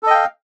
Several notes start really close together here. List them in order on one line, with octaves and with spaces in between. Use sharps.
A4 D#5 G5 F5